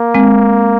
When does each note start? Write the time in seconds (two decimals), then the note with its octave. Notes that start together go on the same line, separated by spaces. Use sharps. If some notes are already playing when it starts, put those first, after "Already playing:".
Already playing: A#3
0.15 G#3 C4